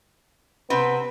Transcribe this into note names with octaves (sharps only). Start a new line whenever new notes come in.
C3 B3 C4 B4